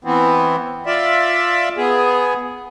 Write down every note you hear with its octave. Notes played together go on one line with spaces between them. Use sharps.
E3 B3 C4
F4 D5 E5
B3 G#4